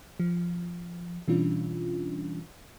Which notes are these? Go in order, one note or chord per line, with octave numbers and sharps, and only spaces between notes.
F3
B2 E3 G3 C#4 D4 F4